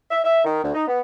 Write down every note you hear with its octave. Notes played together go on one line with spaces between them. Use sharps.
E5
E5
D#3
D2
D#4
B3